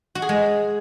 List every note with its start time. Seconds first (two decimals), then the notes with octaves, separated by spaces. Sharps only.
0.15 F#4
0.22 G#4
0.29 G#3